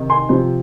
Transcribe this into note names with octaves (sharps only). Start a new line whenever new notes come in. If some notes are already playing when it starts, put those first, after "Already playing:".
Already playing: C3 D#3
G#5 C6
C3 F3 C4